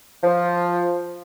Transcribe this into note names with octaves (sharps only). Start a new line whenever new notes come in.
F3